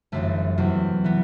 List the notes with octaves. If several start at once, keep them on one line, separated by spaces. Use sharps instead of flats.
G1 F#2 E3 A3
E2 C3 F#3
E3 G3 B3